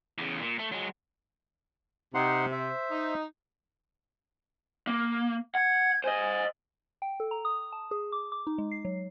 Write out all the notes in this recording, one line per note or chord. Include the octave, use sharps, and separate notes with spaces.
E2 C#3
A#2
A3
F#3 G#3
C3 D#4 F#5 C6
C5 E5
D#4
A#3
F#5 G#6
C5 D#5 G#5
G5
A4
A#5
D#6
A5
G#4
D6
D6
D#4
G#3
C7
F#3